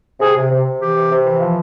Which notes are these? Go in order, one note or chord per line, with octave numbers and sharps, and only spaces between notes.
C3 G#4
C3
C3
C3
E3 G4
C3
C3
E3
F3